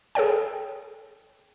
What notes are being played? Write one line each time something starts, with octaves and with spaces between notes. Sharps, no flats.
G#4 A4 C#5 G5